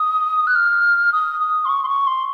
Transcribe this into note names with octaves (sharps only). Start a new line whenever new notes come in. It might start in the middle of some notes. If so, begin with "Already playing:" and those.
Already playing: D#6
F#6
F6
D#6
D#6
C6
C#6
C6
C#6
C6